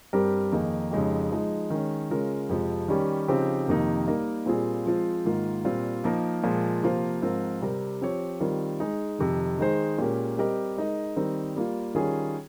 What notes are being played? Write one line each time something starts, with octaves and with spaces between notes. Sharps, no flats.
G2 G3 C4 G4 A#4
F2 D#3 A#3 D#4 G#4
F2 C#3 G#3 D#4 G4
F3 G#3 D#4 G#4 D#5
D#3 G#3 C#4
C#3 G#3 C#4 F4 A#4
F2 C3 F3 G#3
D#3 G3 C#4 G4
C#3 F3 C4 D#4 G4
F2 C3 D#3 A#3 D#4
G3 A#3 D#4 A#4 D#5
A#2 G3 C4 F4 G#4
F3 G#3 C4 F4 C5
G#2 D#3 A#3 F4
A#2 G3 C4 F4
F3 A#3 D#4 A#4
A#2 F3 G#3
C3 F3 A#3 F4 C5
G#2 F3 C4 F4 A#4
C3 G3 C4 G4 A#4
F3 C4 G4 C#5
D#3 G3 C4 F4 A#4
G#3 D#4 G#4
F2 C3 D#3
D#3 G#3 D#4 G#4 C5
A#2 G#3 C#4 G4 A#4
G3 C4 G4 A#4 D#5
G#3 D#4 A#4 D#5
D#3 G3 C4 D#4 A#4
G3 A#3 F4
D#3 G3 C#4 F4 G#4